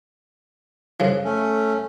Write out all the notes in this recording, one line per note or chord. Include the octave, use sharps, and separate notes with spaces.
F#2 C#3 F3
A3 C#4